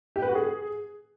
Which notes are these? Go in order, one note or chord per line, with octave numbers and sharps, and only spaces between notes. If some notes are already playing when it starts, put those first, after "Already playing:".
G4
B4
F#4
G#4